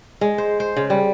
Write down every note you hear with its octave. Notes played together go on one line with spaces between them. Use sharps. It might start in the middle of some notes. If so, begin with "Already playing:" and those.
G#3
C5
C5
C#3
G3